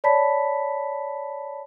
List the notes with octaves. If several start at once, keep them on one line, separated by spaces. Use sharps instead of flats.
C#5 D5 A5 B5 B6